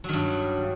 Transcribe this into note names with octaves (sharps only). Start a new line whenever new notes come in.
G2 D#3 F#3